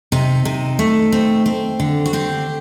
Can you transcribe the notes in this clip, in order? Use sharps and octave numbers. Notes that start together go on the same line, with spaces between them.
C3 D#4
C3
A3
C4
C4
D3
F#4
C4 G4